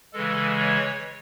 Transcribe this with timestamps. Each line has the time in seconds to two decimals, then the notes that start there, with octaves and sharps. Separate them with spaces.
0.13 C#3 E3 G#3 A4
0.59 C#5